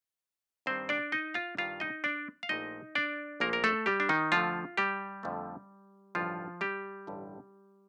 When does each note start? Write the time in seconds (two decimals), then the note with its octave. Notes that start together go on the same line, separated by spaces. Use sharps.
0.66 G2 D#3 G3 C4 C5
0.89 D4 D5
1.12 D#4 D#5
1.34 F4 F5
1.57 G2 D#3 G3 F4 F5
1.80 D#4 D#5
2.04 D4 D5
2.43 F5
2.49 A#1 A#2 F3 A3 D#4 D#5
2.95 D4 D5
3.40 A#1 A#2 F3 A3 A#3 A#4
3.53 A#4
3.64 A3 A4
3.86 G3 G4
4.00 D4
4.09 D#3 D#4
4.32 F2 D3 F3 A3 F4
4.77 G3 G4
5.23 F2 D3 F3 A3
6.15 A1 G2 D3 F3 F4
6.61 G3 G4
7.07 A1 G2 D3